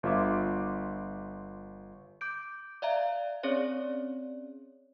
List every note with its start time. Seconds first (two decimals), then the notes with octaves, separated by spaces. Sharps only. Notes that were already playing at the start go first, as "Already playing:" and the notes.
0.03 G1 F4 E5 D6
2.21 D6 G6 D7
2.82 D5 E5 F5 A#5
3.43 C4 C#4 G#4 C#5 D5